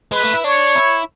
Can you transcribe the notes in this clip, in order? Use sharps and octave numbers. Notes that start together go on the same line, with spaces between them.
G#3 B4
A3
E4
D4 C#5
E4